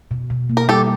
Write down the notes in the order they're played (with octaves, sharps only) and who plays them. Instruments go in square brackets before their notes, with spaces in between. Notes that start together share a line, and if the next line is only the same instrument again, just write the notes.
[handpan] B2
B2
A#3
[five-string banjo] A#4
[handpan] G3 [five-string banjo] G4 A4